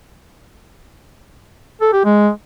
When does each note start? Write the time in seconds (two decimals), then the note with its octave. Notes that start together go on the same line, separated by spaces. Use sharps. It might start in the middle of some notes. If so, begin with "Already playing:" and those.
1.81 A4
1.93 G4
2.05 G#3